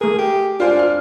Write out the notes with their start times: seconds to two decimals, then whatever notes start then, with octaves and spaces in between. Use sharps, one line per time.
0.01 A3 G#4 A#4
0.19 G4
0.60 D4 F4 C5 G#5
0.79 F6